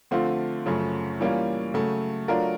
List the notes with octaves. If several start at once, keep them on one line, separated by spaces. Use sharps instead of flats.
D3 F3 A3 C4 F4
F#2 C#3 F3 A3
E3 G3 A#3 C#4 F4
C#3 F#3 A3
F#3 A3 D4 F4 A#4